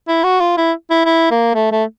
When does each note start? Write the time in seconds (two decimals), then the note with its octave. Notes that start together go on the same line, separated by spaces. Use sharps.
0.08 E4
0.24 F#4
0.40 F4
0.57 E4
0.90 E4
1.05 E4
1.31 A#3
1.55 A3
1.71 A3